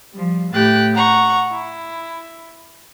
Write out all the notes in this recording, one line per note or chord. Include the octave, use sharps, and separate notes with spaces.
F3 G3
A2 A3 G4 G5 F#6 A6
F#5 A#5 C#6
E4